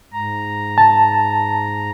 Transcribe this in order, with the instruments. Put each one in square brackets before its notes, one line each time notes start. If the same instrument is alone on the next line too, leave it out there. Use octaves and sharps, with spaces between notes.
[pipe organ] G#2 A#5
[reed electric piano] A5